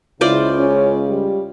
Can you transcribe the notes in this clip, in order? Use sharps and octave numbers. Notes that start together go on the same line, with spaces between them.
C#2 C#3 E4 F4 C5 D5
C#4
G3